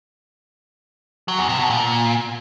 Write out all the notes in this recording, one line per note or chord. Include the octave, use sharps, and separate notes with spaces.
F#3
E2
C3
B2
A#2